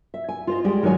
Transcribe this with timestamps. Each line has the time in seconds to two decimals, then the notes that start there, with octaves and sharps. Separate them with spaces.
0.14 E5
0.29 G#5
0.47 F4 C5 D#5
0.64 G3 G#3 G4 G#4 G5
0.83 D#3 F#3 G#3 C#5 G#5